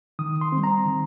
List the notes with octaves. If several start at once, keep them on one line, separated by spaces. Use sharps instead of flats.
D#3 D#6
C6
G3 C4
A#5
D#3